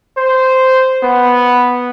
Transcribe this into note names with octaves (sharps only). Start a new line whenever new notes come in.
C5
B3